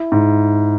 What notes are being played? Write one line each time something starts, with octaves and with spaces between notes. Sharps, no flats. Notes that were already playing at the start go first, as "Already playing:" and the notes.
Already playing: E4
G#2